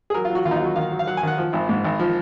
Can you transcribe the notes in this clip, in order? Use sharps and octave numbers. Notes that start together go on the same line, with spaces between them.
G#4
F#3 A#4
F4
F#3 F#4
D#2 F4
D#4
F4
F#3 F#4
D#3 F5
F#3
F5
F#3 F#5
G#5
D#3 F#5
F3
G#1
G#2
G#1
F3